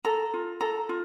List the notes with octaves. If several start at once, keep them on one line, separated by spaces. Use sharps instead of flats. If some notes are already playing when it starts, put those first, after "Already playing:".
A4 A#5
F4
A4 A#5
F4